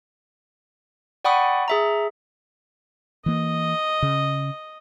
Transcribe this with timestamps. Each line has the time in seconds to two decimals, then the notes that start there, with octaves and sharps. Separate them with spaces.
1.25 D5 F#5 G5 B5 C#6 D#6
1.68 G#4 E5 A#5
3.26 E3 A#3 D#5
4.02 C#3